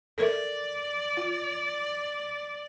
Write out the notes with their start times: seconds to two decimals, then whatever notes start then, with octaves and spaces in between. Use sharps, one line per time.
0.18 A4 A#4 D5 E5
1.17 F4